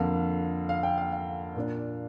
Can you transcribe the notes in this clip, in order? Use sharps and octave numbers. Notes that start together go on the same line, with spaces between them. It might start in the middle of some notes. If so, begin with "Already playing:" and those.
Already playing: F2 D3 A#3 D4 F5
F5
G5
F5
F5
A#2 A#3 D4